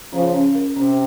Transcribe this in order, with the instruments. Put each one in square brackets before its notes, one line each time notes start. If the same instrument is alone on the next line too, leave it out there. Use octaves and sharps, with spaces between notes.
[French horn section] C#3 F3 [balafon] C#4
[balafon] C#4
A#4
[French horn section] C3 [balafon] C#4